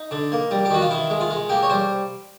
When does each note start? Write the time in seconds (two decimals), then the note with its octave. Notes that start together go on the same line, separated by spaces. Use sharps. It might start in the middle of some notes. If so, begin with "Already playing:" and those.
Already playing: D#4
0.11 D3
0.32 A#3
0.51 G3
0.65 G4
0.70 D#3 F#4
0.82 F4
0.90 D#3 E4
1.10 G#3
1.20 F4
1.31 G#3
1.49 A#3 G4
1.63 C#5
1.70 G3 C5